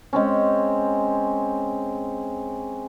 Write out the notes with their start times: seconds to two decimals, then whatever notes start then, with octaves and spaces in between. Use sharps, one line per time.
0.13 G#3 C4 C#4